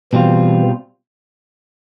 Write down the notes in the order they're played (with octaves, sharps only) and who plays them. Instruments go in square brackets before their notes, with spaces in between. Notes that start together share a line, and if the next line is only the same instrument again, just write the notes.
[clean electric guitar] B2 G3 C4 F4 [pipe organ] E3